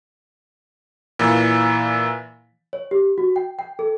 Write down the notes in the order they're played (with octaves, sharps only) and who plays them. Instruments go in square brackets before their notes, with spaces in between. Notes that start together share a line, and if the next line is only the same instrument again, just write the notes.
[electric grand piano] A#2 E3
[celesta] C#5
G4
F#4
G5
G5
A4